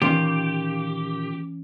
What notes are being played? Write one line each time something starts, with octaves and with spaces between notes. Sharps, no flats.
A#2 D#3 E3 C#4 F4 G4